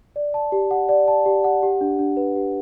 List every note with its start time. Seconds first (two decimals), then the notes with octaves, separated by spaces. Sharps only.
0.16 D5
0.34 A5
0.52 G4
0.71 F#5
0.89 D5
1.08 A5
1.26 G4
1.44 F#5
1.63 G4
1.81 D4
1.99 D4
2.17 B4
2.36 G4